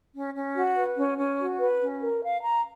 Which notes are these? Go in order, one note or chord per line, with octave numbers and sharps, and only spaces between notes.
C#4
C#4
F#4
B4
C#4
C#4
F#4
B4
C#4
A#4
F5
A#5